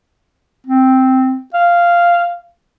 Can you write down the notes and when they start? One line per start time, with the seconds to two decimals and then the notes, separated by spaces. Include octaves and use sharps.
0.67 C4
1.54 F5